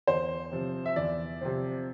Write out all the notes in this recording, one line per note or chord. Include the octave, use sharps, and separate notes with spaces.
E2 C5
C3 F3 C4
E5
E2 D5
C3 F3 C4